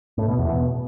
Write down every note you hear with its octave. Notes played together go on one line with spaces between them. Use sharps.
A2
B2
E2
B2